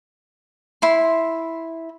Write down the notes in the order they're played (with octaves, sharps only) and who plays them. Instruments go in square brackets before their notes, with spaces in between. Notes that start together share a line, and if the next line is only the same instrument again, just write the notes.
[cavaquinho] E4 C6